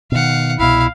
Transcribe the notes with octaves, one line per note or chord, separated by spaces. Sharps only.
B2 D#3 F5 F#5
C2 B2 E4 F5